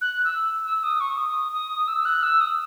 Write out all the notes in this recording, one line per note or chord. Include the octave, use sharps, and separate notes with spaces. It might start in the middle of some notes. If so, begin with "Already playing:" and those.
F#6
E6
E6
D#6
C#6
D#6
D#6
E6
F#6
E6
D#6